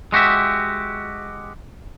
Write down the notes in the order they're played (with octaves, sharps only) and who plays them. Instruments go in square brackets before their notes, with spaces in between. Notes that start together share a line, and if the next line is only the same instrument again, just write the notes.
[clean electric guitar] G#3 F#4 G4 E5